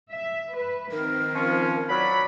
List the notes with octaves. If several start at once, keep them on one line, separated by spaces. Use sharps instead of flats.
E5
B4
D#3 C4 A#4
F3 C#4
F#3 D5 B5